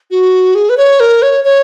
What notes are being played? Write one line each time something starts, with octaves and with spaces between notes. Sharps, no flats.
F#4
G#4
B4
C#5
A#4
C#5
C#5